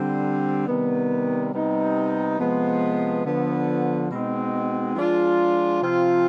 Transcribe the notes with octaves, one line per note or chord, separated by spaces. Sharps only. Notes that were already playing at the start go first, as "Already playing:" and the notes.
Already playing: D3 G3 C4
C3 D#3 G3 B3
C3 G3 B3 D#4
C3 F3 G#3 B3
D3 F3 B3
B2 G#3 C4 D#4
F3 G#3 D4 F4
C3 F3 C4 F4